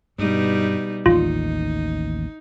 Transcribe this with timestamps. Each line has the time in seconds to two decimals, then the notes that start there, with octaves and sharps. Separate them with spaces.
0.19 G2 B2 G3 D#4
1.06 A1 D#2 D#3 D#4 F4